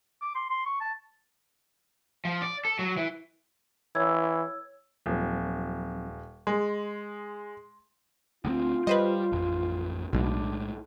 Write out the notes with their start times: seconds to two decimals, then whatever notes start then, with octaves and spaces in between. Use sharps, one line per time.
0.21 D6
0.35 C6
0.50 C6
0.66 C#6
0.80 A5
2.25 F3
2.42 D5
2.65 A4
2.79 F#3
2.97 E3
3.95 E3 C#5 E6 G#6
5.06 D#1 F3 F#3 C4
6.47 G#3 C6
8.45 D2 G3 C4 F4
8.87 G3 B4 C5 D#5
9.32 A1 F2
10.13 B1 A2 G#3 D4